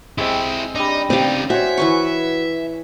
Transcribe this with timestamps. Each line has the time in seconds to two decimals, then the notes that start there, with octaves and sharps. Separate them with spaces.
0.18 G#3 C4 E4 G4
0.75 G3 D4 D#4
1.10 C#3 C4 D#4 G4 D5 F5
1.50 F#4 C5 C#5 E5 G#5
1.77 E3 B4 C#6